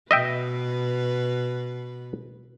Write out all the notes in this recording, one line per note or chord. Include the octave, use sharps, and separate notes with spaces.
B2 B4 D#5 E5 G5